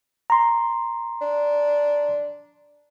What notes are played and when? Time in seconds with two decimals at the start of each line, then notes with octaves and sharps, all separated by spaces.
0.30 A#5 C6
1.21 D4